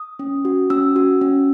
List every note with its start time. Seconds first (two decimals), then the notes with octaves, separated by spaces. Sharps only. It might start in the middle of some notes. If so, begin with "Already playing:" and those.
Already playing: D#6
0.19 C#4
0.45 F#4
0.70 C#4 E6
0.96 F#4
1.21 C#4